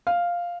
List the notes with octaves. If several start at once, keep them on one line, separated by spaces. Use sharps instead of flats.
F5